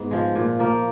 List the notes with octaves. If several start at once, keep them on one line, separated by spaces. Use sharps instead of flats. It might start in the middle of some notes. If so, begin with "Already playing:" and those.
Already playing: G#2 B3
F3 G#3
A#2
F3 A#3